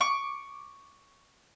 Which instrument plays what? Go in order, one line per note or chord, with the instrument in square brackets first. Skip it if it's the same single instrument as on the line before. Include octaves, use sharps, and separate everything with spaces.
[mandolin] C#6 D6